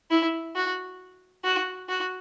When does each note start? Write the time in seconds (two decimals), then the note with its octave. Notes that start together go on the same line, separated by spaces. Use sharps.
0.10 E4
0.56 F#4
1.44 F#4
1.88 F#4